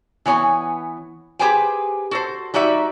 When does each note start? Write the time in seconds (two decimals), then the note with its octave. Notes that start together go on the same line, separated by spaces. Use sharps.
0.26 E3 B3 C#5 G#5
1.39 G4 G#4 B4 C5 G5 G#5
2.11 F#4 A4 C5
2.54 G3 D#4 F#4 D5 E5